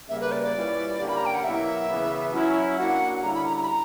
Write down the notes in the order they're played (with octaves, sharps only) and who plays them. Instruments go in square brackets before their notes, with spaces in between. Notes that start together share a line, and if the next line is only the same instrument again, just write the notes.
[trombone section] C#3 G3 A#3 [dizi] E5
[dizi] B4
D5
D5
[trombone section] A#2 G3 C#4 E4 B4
D3 A#3 C#4 G4
[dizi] B5
A#5
G5
F#5
[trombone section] B2 F#3 A#3 E4 [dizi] E5
[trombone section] C#3 E3 B3
F#3 C#4 E4
[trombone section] A#3 D4 F#4 [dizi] F#5
[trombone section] D3 G3 C#4 E4 [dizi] A#5
[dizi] B5
A#5
A#5
B5
A#5